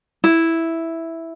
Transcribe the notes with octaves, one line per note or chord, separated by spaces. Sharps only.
E4